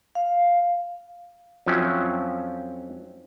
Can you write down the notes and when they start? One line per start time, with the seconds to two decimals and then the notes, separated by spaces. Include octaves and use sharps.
0.15 F5
1.66 F2 F3 F#3 C#4 E5 G5